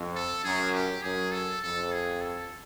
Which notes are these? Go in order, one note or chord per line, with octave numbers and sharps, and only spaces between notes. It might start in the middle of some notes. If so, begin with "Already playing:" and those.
Already playing: F2
A4
F#2 G#4
G4
F#2 G#4
A4
F2 A4
G#4
A4